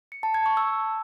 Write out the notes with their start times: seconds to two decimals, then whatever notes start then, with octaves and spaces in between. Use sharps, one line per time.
0.12 C#7
0.23 A5
0.34 G#6
0.46 C#6
0.57 E6